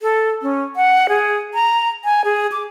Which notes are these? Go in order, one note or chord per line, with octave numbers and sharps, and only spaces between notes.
A4
C#4
F#5
G#4
A#5
G#5
G#4
D6